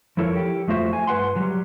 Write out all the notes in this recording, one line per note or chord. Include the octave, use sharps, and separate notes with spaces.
F2 F3 E4 A4 A#4 C#5
G4
F2 A3 F4 F#4 C5 E5
G#5
G2 B4 F#5 C6
F#3 G3